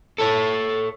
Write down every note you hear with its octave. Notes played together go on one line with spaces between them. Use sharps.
A4 C#5